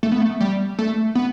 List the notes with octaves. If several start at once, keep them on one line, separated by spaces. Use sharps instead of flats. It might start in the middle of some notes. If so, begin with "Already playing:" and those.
A3
B3
A3
G3
A3
B3